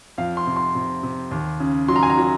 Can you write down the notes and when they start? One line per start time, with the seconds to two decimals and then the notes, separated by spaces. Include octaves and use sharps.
0.18 F2 F5
0.37 C6
0.47 C3
0.56 C6
0.75 C3
1.03 C3
1.31 D#2
1.60 C#3
1.88 F#3 C6
1.96 A#5
2.03 G#5
2.10 A#5
2.17 F#3